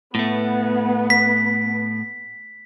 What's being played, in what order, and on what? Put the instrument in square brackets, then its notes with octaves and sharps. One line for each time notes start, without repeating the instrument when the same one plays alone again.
[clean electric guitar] A2 A3 [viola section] B3
[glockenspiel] B6